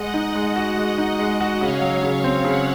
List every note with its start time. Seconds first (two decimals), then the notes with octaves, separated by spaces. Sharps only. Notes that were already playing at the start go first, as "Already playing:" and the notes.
Already playing: G#3 D#5 F#5
0.14 D#4
0.35 G#3
0.56 F#4
0.77 G#3
0.98 D#4
1.19 G#3
1.41 F#4
1.60 C#3 C#5 F5
1.81 F#3
2.03 C#3
2.24 C4
2.44 C#3 F#5